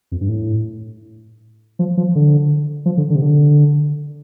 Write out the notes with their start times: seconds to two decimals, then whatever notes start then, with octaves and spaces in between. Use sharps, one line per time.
0.12 F2
0.21 G2
0.29 A2
1.79 F3
1.97 F3
2.15 D3
2.86 F3
2.98 D3
3.10 D3
3.15 C3
3.22 D3